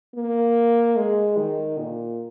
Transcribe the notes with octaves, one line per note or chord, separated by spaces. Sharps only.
A#3
G#3
D#3
A#2